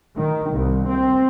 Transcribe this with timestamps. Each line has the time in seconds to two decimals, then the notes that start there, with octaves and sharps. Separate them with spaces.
0.16 D#3
0.51 C2
0.89 C4